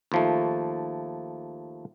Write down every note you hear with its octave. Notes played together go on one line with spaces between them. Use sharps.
D#2 F3 A3